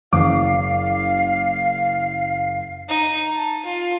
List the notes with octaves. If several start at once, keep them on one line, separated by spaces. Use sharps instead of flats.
F#1 F5 D6
D#4
A5
F4